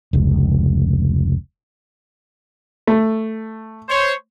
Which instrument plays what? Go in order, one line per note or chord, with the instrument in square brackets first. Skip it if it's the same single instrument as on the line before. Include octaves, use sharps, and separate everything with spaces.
[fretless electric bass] F1 C#2
[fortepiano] A3
[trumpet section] C5 C#5